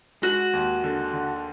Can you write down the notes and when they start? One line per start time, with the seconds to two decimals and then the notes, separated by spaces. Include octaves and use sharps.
0.22 G#3 F#4
0.53 D#2
0.84 D3
1.13 D3